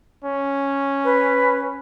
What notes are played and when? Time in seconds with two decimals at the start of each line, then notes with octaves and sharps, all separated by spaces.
0.24 C#4
1.04 B4